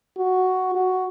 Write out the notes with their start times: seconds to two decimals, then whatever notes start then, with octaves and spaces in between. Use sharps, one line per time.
0.18 F#4
0.75 F#4